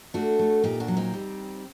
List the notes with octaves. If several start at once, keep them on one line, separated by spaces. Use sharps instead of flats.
A3 D4 F#4
A3
A#2 D#4 G4
D4 F#4
F#3
C4 D#4
G3